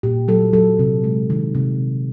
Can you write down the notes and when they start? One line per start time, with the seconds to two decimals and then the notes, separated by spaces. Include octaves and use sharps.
0.03 A#2 G4
0.28 F#3 A4
0.53 F#3 A4
0.79 C3
1.04 G#3
1.30 D#3
1.55 C3